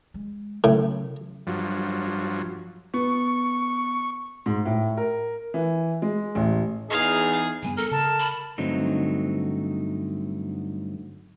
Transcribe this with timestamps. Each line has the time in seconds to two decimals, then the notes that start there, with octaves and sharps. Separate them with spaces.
0.14 G#3
0.64 A2 C#3 F#3
1.47 G2 F3 F#3
2.94 B3 C#6
4.46 G#2
4.65 A2
4.97 A#4
5.54 E3
6.02 G#3
6.35 A1
6.90 E2 D#4 G#4 F5
7.63 F#1 G2 B3 G#5
7.77 A4 A#4
7.91 C#3 A#4 A5
8.19 B5
8.58 G2 D3 F#3 A3 C4 D#4